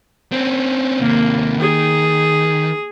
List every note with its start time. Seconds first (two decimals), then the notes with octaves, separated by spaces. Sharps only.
0.32 C4 C#4
1.00 D#2 C3 A#3
1.60 D#3 G#4